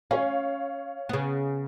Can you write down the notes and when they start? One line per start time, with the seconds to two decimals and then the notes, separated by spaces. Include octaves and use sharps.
0.11 C#4 C#5 F5
1.09 C#3 B3